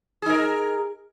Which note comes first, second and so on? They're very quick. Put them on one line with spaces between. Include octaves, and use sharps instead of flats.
G#4 D#4 A#4